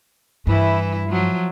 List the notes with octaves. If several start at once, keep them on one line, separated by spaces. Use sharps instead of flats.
G2 E3 E4
F3 F#3